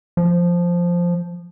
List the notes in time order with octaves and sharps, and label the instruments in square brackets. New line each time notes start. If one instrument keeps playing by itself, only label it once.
[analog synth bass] F3